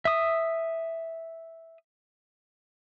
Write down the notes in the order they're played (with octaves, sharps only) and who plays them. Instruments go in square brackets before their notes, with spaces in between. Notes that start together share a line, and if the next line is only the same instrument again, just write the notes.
[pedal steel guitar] E5 D#6